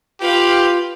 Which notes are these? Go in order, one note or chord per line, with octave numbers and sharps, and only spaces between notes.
F4 G4 B4 F5